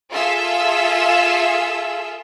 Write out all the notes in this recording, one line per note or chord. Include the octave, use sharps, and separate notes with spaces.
F4 G#4 A4 E5 E6